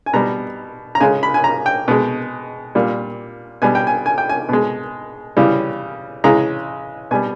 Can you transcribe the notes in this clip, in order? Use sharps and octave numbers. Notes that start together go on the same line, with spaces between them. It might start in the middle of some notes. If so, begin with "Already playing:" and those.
G#5
B2 G3 A#5
A#5
C#3 G#3 G#5
B5
G#5
A#5
G5
B2 G#3
A#2 G3
B2 G3 G#5
G5
G#5
G#5
G5
G#5
B2 G#3
C#3 E3 G3
C#3 E3 G#3 A#5
B2 G3 G#5